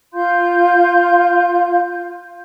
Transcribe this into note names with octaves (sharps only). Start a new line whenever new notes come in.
F4 F5 C6 G6